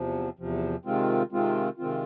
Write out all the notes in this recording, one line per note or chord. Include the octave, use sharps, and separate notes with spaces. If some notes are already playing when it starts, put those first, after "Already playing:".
Already playing: E2 C3 F3
E2 C3 F3
C3 D#3 G#3 C4 F4
C3 D#3 G#3 C4 F4
C3 D#3 G#3 C4 F4